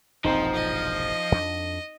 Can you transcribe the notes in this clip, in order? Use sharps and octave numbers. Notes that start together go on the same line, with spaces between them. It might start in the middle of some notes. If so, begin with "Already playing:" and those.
E1 A#1 G2 F3 C4 D#4
D#5
F2 D4